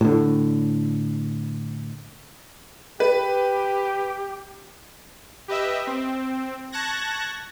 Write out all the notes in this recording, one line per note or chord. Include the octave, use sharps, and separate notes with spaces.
A2 D3
G4 B4
G4 B4 D#5 E5
C4
A5 C#6 F#6 G#6 A#6